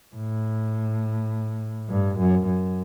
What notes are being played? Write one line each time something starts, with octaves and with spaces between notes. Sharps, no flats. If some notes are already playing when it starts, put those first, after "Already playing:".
A2
G2
F#2
F#2